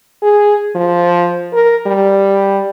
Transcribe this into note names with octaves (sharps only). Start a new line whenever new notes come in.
G#4
F3
A#4
G3